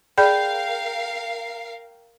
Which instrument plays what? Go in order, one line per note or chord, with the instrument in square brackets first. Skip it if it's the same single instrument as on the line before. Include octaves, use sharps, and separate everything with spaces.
[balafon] G#4 D5 B5 [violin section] A#4 F5 C7 [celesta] G5 G6